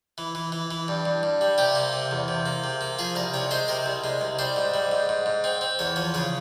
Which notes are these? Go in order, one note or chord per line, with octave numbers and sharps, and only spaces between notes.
E3
E3
E3
E3
G2
G2
G2
G3
C3 G4
A#3
C3
E2
C3
A#3
C3
A#3
F3 G#4
C2 A#4
C3 C#5
G#3 C5
C3 A#4
C2
G#3
C2
G3 C5
G#2
G3
G#2
G#2
G#2
C4
C4
E2 C#5
F3 C#5
C#3 C#5